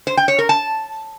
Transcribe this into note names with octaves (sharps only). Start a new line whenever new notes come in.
C5
G5
C#5
A#4
A5